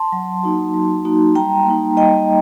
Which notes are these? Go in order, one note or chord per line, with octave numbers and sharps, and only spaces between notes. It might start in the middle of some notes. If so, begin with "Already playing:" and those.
Already playing: A5 C6
F#3
A#3 D#4 F#4
F#3
A#3 D#4 F#4
G3 G5 A#5
A#3 D#4
G3 D#5 G5